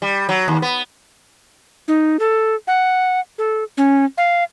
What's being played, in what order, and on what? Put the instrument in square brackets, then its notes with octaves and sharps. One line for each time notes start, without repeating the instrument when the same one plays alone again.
[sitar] G3
F#3
D#2
B3
[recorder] D#4
A4
F#5
A4
C#4
F5